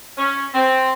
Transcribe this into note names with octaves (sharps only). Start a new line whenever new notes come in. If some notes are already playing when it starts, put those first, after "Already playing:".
C#4
C4